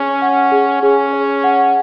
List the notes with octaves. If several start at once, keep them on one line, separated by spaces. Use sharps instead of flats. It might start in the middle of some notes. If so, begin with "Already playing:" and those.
Already playing: C#4 G#4 C#5
F#5
G#4
C#4 G#4
C#5
F#5